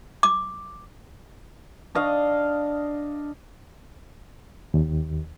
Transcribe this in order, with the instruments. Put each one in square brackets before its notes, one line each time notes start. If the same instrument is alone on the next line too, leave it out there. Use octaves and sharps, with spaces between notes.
[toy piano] D6
[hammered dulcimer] D4 D#5 F5
[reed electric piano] D#2